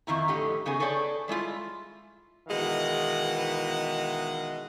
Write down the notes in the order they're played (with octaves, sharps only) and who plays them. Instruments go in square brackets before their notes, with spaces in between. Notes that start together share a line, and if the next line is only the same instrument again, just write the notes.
[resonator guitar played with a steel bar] F2 D#3 E4 A#5
F2 A2 D3 G4 D#5
C#3 B3 D#4 G#4 G#5
G#4 A4 B4 C#5 D5 G5
G3 G#3 E4 F4
[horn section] B2 D#3 E3 G#3 F5 F#5